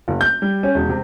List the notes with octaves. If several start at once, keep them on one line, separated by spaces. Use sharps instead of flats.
F#1
G6
G3
C#4
E1
C3